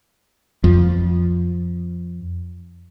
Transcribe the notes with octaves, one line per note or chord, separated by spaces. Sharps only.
F2 F3